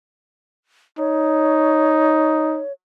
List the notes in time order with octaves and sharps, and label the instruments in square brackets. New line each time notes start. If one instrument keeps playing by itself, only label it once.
[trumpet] D#4 [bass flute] C#5